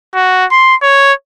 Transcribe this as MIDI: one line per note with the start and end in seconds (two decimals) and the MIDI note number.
0.15 0.45 66
0.51 0.75 84
0.82 1.13 73